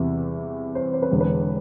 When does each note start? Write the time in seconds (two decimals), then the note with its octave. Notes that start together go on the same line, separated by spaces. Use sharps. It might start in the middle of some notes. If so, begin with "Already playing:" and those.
Already playing: E2 C3 E3 G3 E5
0.75 C5
0.93 C5
1.02 B4
1.11 E1 E2 D3
1.20 B4